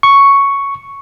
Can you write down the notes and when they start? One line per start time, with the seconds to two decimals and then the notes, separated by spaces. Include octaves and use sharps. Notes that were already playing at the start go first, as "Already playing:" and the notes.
0.03 C#6